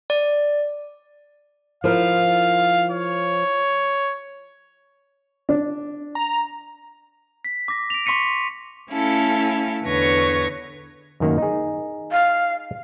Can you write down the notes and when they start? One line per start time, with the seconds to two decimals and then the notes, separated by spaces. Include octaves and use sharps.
0.10 D5
1.84 F3 E4 A#4 F5
2.92 C#5
5.49 D4
6.15 A#5
7.45 B6
7.68 D6 A#6
7.90 D7 F7
8.06 C6 C#6 B6 C#7 D#7
8.90 A3 C#4 E4 A4 F5
9.85 E2 D3 B4 C#5 C#6 A#6
11.20 F#2 D#3 A#3
11.38 D#4 G#4
12.12 F5